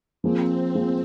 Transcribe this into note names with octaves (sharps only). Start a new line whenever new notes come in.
F3 A#3 C4 F4 G#4
F3 A#3 F4 G#4